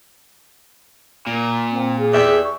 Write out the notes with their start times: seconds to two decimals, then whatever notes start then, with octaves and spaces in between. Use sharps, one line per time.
1.27 A#2 A#3
1.71 C4
1.98 G#4
2.13 E2 G4 D5 E5
2.44 C#6